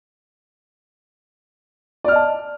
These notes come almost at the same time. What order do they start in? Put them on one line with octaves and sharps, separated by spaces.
D5 F6 D#5 A5